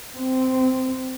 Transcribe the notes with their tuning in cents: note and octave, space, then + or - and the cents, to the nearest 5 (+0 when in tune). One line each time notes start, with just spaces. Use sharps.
C4 -15